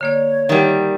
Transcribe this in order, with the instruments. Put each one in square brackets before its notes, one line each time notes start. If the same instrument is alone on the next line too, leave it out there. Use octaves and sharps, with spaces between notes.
[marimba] D3 A#3 D5 [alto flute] C#5
[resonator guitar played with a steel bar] D#3 G3 [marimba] E5 F#5